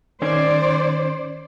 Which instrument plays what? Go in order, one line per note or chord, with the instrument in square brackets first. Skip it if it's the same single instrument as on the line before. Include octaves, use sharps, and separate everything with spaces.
[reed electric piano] D#3 C#4 G#6 [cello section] C5 D5